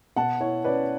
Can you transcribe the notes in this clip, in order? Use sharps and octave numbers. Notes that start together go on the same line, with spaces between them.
B2 F#5 A5
E4 C#5
C#4 B4 D5